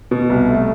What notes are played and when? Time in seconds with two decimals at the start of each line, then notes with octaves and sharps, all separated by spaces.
0.11 B2
0.29 C2
0.48 A3